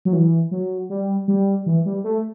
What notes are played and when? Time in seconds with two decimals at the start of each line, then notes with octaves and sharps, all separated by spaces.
0.05 F#3
0.13 E3
0.51 F#3
0.90 G3
1.28 G3
1.66 E3
1.86 G3
2.04 A3